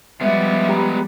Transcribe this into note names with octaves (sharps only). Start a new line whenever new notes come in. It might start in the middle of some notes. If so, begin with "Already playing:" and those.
F3 G3 G#3 B3 E5
G4 A#5 B5